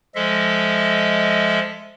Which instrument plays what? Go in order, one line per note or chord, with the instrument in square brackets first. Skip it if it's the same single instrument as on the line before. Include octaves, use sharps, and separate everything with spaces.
[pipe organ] F3 G#3 A4 D#5 E5